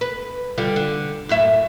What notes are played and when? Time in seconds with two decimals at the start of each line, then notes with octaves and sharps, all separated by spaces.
0.01 B4
0.58 D3 G3 F4
0.76 D3
1.29 F#2 A2 E5